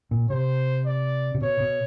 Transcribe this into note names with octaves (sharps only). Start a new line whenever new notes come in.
A#2
C3 C5
D5
C3
B2 C#5
B2